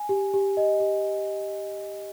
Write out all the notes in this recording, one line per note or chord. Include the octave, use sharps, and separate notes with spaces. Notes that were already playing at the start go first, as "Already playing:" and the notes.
Already playing: G#5
G4
G4
D#5
G4